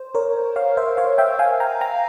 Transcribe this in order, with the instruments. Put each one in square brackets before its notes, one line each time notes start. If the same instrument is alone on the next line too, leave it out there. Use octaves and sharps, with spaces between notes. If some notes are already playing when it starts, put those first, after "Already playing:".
Already playing: [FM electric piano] C5
A#4 C#5
C#5 F5
C5 E5
C#5 F5
E5 G5
F5 G#5
G5 A#5
G5 A#5